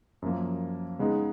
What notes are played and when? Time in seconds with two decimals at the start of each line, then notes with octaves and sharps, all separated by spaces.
0.22 F#2 F3 A#3
0.99 C#3 G#3 B3 D#4